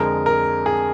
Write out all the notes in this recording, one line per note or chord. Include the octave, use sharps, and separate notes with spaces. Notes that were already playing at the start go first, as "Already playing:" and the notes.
Already playing: F2 D3 G#3 A#4
A#4
G#4